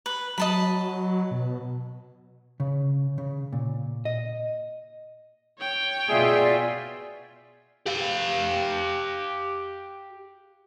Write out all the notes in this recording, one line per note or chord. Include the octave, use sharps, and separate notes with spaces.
B4
F#3 D#5 A5 B5
B2
C#3
C#3
A#2
D#5
C#5 G5
B2 F4 G#4 D5 E5
G4 F5